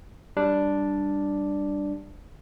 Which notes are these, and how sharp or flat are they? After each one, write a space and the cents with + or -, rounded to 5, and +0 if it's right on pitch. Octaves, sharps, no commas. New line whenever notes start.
G3 +0 D4 +0